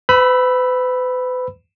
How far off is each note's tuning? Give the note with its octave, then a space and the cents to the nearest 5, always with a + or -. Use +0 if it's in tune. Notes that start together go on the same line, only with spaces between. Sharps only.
B4 +40 B5 +0 E6 +0